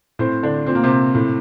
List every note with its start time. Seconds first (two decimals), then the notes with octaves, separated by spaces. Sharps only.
0.19 A2 C4 C5
0.43 D3 D4
0.66 A#2 C4
0.75 A#3
0.83 C3 C4
1.15 A2